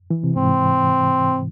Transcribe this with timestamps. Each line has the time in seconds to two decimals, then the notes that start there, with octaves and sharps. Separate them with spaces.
0.10 E3
0.24 C3
0.36 G#2 C4